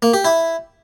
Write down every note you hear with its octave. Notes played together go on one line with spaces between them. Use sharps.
A#3
G4
E4